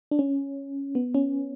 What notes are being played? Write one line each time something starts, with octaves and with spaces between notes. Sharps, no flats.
D4
C#4
B3
C#4